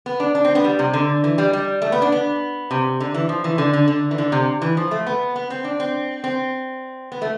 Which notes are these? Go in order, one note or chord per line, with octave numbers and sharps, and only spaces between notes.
B3
D4
D4
C4
B3
G3
C3
D3
E3
G3
G3
A3
B3
D4
B3
C3
D3
E3
F3
E3
D3
D3
D3
E3
D3
C3
E3
F3
A3
B3
B3
C4
D4
C4
C4
B3
A3